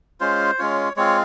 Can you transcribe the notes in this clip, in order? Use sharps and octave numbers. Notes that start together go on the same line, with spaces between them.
G#3 C#4 F4 C5
G#3 C#4 F4 C#5
G#3 C4 F4 C#5